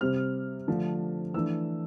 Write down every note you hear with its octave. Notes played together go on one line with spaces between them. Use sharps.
C3 G3 C4 F6
D3 F3 A3 D4
E3 A3 D4 E6